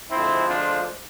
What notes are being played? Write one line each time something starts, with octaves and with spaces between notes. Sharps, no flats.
D2 D3 F3 G#3 C4 E4
D4 F4